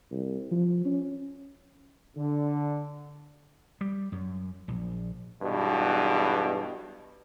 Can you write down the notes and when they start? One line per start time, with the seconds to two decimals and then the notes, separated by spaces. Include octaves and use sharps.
0.11 C2
0.51 F3
0.85 C#4
2.16 D3
3.81 G3
4.12 F#2
4.68 A#1
5.42 B1 E2 G2 B2